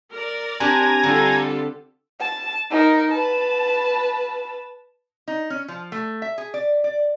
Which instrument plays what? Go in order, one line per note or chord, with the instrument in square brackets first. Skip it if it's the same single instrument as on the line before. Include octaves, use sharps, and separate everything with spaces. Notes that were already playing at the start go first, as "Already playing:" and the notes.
[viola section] A#4 D5
[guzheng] C4 D4 G4 [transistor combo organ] G#5 A#5
[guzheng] D3 [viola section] G3 F4 A4
[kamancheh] A5
D#4 A#4
B4 A5
[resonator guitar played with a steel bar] D#4
C#4
F3
A3
E5
G#4
D5
D5